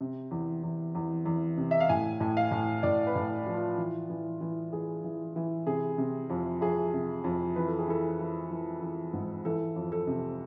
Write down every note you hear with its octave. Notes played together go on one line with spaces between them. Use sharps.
C3
E2
E2
E2
E2
C3
E5
F5
A2 G#5
A2
F5
A2
A2 D5
B4
A2
F3
F4
E3
E3
E3
E3 G#4
E3
E3
C3 G#4
C3
F2
F2 G#4
C3
F2
E3 B4
A4
G#4
E3 A4
E3
E3
E3
G#2
E3 A4
F2
A4
C3